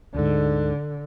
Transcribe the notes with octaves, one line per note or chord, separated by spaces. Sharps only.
D2 G#2 D3